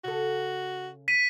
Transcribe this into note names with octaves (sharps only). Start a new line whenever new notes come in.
C#3 F#4 A4
B6 D#7